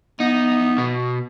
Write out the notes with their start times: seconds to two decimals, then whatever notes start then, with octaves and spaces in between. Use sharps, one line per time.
0.20 B3 D#4
0.78 B2